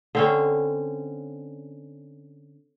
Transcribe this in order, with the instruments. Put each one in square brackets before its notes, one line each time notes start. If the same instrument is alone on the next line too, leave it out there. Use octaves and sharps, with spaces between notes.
[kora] D3 C4 C#4